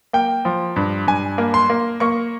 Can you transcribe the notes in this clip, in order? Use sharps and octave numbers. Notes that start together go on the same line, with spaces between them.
A#3 G5
F3
G2
G2 G#5
A#3
C6
A#3
A#3 C#6